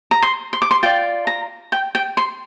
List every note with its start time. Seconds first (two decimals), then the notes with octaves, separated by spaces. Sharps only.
0.11 A#5
0.22 C6
0.53 C6
0.62 D6
0.71 C6
0.83 F4 D5 G5
1.27 A#5
1.72 G5
1.95 G5
2.17 C6